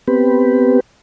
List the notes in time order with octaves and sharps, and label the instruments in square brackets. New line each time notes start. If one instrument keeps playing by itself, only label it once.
[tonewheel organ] B3 C4 G4 B4